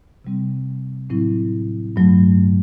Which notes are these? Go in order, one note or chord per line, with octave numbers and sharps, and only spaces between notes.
C3 G3 C4
A2 F#3 C4 E4
G2 F#3 A3